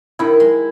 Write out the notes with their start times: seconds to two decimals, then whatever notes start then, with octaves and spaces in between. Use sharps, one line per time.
0.19 D#3 E4
0.40 G#3